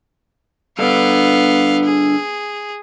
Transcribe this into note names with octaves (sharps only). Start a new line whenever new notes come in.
G2 D3 B3 F5
G#4